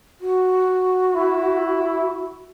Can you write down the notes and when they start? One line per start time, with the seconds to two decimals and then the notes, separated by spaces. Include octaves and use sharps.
0.21 F#4
1.16 E4